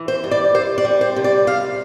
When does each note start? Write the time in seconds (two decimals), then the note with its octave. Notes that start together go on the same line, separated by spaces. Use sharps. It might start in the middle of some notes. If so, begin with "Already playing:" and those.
Already playing: E3
0.08 C5
0.24 G2
0.31 D5
0.55 C3 C5
0.78 D5
0.85 G3
1.01 C5
1.16 C3
1.24 D5
1.47 C3 F5